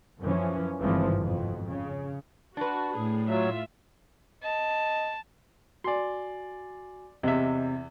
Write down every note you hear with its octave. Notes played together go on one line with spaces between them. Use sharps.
F#2 E3 F3 C#4
G#1 G2 C3 E3 F3 C4
F2 B2
C#3
D4 F#4 B4
A2 G#4
F#3 F4 E5
D#5 A5
F#4 D5 G#5 C6
E2 C3 D#5 E5